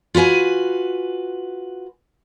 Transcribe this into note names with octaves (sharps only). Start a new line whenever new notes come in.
F4 F#4 B4 G#5